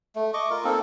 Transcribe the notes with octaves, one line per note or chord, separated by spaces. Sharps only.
A3
D#5 C#6 D6
F4 A#4
A#3 C4 D#4 A4